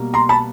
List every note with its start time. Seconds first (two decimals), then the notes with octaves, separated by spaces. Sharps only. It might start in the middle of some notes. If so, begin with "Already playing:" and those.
Already playing: B2 G3 A#3
0.14 A#5 C6
0.29 A5 B5